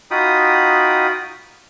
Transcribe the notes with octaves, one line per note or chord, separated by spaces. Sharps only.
D#4 F4 F#4 G5 B5 D#6